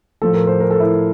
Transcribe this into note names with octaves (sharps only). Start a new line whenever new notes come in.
A2 F3 A4
A#4
C5
A#4
A4
E4